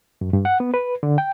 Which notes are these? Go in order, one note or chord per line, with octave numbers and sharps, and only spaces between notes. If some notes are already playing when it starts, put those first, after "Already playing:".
F#2
G2
F#5
B3
B4
D3
G5